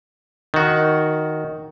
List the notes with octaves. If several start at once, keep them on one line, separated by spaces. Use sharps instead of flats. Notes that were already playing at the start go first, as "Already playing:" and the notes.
D#3 F#4